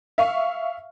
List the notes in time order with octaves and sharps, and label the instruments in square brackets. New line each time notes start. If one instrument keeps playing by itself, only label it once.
[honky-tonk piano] E5 F5 C#6